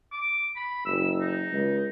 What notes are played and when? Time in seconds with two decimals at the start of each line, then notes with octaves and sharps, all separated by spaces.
0.12 D6
0.56 B5
0.86 F#1 E6
1.21 D#4
1.51 C#2